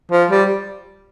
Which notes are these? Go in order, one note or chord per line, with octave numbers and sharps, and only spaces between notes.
F3
G3